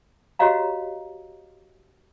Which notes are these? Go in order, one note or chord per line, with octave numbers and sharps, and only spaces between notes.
F#4 G4 C#5 D#5 F5 A#5